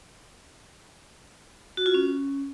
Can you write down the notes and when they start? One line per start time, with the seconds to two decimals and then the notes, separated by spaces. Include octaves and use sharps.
1.77 F#4
1.86 F4
1.94 C#4